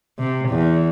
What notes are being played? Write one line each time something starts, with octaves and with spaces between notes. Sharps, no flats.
C3
E2